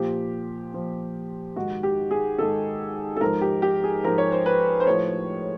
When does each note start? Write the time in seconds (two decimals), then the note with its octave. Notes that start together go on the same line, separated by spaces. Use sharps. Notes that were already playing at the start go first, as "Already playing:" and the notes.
Already playing: A#2 F3 G4
0.73 A#2 F3
1.56 G#2 D#3 F#4
1.83 G4
2.11 G#4
2.38 G#2 D#3 A4
3.17 A4
3.21 G#2 F3 A#4
3.41 G4
3.62 G4
3.84 G#4
4.04 G#2 F3 A#4
4.18 C#5
4.32 C5
4.46 B4
4.80 C5
4.87 A2 F3 C#5